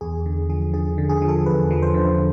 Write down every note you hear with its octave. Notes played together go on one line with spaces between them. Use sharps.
E2 G#4
D3
F3 G#4
D3 G#4
D3
G#4
F3
A4
E2 B4
F3
C5
D3